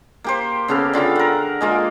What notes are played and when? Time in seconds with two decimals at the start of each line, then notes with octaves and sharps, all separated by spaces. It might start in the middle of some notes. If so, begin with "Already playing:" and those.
0.24 A#3 G4 C5
0.68 C#3 B3 A4 F5
0.93 D3 F4 G5 D6
1.16 A#4 F#5
1.61 G#3 A#3 F4